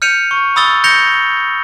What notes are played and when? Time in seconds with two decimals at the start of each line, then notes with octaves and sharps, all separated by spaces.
0.02 F6 G6 C#7 D#7 F7
0.31 C#6
0.56 B5 D#6 E6 A6 G7
0.84 G6 A#6 C#7 F7 G7